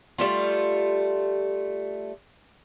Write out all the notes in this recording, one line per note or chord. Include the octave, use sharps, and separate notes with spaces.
G3 A3 F4